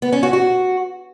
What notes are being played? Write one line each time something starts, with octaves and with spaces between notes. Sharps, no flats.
B3
C#4
F#4
F#4